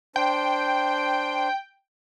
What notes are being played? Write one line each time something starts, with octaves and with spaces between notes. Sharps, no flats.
D4 C5 G5